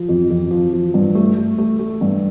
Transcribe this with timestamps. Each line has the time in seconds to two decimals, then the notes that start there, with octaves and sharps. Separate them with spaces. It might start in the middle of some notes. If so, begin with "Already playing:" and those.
Already playing: F3
0.09 F2
0.30 F2
0.51 F3
0.73 F3
0.94 G2
1.15 A3
1.36 A3
1.58 A3
1.79 A3
2.01 G2